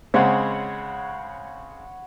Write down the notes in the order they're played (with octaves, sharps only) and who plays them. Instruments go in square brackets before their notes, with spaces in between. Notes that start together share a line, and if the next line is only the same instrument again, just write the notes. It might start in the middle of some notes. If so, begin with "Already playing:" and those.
[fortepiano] C#3 G#3 C4 [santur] C#5 F#5 B5